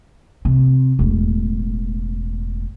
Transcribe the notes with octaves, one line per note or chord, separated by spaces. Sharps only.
C3
E1 A2